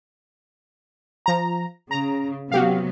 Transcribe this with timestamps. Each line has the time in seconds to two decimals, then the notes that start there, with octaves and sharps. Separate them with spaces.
1.26 F3 A#5
1.91 C#3 A#5
2.52 C3 F#3 B3 F#4 G4 F5